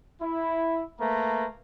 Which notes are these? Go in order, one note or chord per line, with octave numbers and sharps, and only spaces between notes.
E4
A3 A#3 B4 A#5